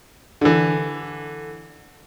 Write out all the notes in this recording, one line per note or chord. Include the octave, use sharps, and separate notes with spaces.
D3 E3